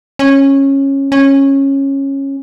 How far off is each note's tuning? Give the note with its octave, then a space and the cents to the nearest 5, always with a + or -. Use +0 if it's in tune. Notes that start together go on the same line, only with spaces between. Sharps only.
C#4 -15
C#4 -15